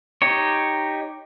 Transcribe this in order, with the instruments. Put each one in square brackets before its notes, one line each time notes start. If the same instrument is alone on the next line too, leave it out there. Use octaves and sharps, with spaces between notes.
[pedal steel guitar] D#4 G4 C#5